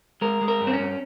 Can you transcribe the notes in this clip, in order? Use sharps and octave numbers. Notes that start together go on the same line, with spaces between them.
G#3 A#4
G#3
A#4
G2
C4
C#4
G2